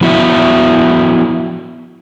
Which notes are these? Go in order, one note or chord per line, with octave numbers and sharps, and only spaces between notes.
F3 B3 E4 F#4 E5